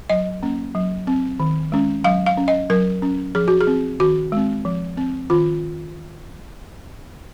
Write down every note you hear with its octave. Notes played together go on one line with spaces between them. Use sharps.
F#3 D#5
A#3 C#4
F#3
C4
D#3
G#3 C#4
F#3 F5
F5
C#4
D#5
F#3 A#4
C#4
F3 G#4
F#4
G#4
C4
D#3 F#4
G#3 C4
F3
C4
D#3 F4